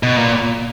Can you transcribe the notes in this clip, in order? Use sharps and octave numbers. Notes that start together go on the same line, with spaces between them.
B2
A#2